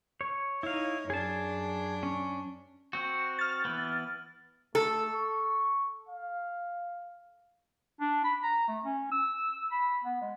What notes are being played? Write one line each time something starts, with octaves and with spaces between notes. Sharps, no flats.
C#5
D#4 E4 C#5 F5
F#2 D4 G#4 A5
C#4
C4 F#4
F6 A6
E3 B3
A3 A4
C#6
F5
D4
B5
A#5
A3
C#4
E6
B5
B3
G#3